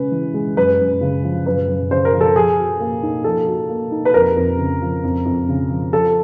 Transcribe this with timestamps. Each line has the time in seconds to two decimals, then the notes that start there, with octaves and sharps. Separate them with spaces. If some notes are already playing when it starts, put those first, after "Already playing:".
Already playing: C#3 G#3 C#4 B4
0.12 E3
0.34 G#3
0.56 F#2 B4
0.79 F#2
1.01 C#3
1.24 F3
1.46 F#2 B4
1.68 F#2
1.91 C#3 C5
2.05 A#4
2.13 F3
2.21 A4
2.36 F3 G#4
2.58 F#4
2.80 A#3
3.03 D#4
3.24 F3 A4
3.46 F#4
3.69 A#3
3.92 D#4
4.05 B4
4.14 F2 A#4
4.36 F2
4.59 C#3
4.81 F3
5.04 F2
5.25 F2
5.49 C#3
5.70 F3
5.92 F3 A4